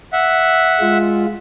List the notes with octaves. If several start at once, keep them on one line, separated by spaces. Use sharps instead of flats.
E5 F#5
G#3 F4